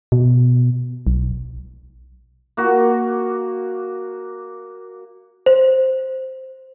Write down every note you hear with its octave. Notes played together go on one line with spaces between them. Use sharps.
B2
B1
A#3 F#4
C5